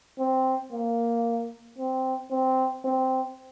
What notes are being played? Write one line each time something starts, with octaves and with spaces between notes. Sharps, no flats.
C4
A#3
C4
C4
C4